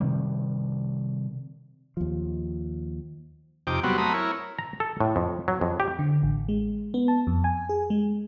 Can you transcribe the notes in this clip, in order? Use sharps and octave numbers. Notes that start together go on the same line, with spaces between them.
C3 D#3 G3
D#2 F3
F2 C3 D#4 G5 D6
F#3 G3 B3 C4 F#4
F#3 A3 C4 A#5 B5 D#6
E4 A#4 C#5
A#5
A4
A2
F2
F#3
F2
G4
D3
A1
G#3
B3
A5
F2
G#5
G#4
G#3